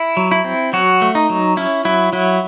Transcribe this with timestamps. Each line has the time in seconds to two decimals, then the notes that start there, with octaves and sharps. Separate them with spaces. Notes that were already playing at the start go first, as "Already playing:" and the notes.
Already playing: E4
0.17 F#3
0.31 E4
0.44 C4
0.73 F#3 F#4
1.02 A3
1.15 D#4
1.30 F#3
1.57 C#4 E4
1.85 F#3 E4
2.13 F#3 E4